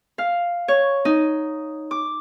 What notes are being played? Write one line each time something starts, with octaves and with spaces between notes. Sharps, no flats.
F5
C#5
D#4
D6